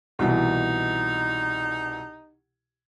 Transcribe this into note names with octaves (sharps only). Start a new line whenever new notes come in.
C2 B2 E3 D#4